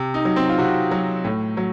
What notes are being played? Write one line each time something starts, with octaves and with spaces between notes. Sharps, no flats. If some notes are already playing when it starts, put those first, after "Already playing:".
Already playing: C3
D#4
F#3
C4
F4
C3 F#4
F#3
A2
F#3